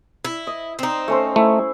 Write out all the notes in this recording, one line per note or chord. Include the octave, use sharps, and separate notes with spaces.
E4
D#5
C4 D#4
A3 C#4 C5
A3 E4